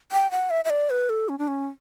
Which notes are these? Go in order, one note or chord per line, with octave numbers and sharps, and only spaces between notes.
G5
F#5
E5
E5
D5
B4
A4
C#4
D4
C#4